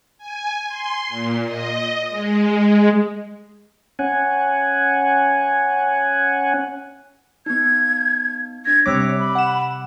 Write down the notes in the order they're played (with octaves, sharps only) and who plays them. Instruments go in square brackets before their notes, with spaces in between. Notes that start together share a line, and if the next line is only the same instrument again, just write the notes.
[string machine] G#5
C6
A#2
D#5
G#3
[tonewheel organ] C#4 F#5 G#5
[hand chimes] B3 D#4 [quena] G#6
[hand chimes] D4 A#6 [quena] G#6
[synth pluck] C3 G3 D6 [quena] C#5 [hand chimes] E6 F#6 B6
[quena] B5
[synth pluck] F#5 E7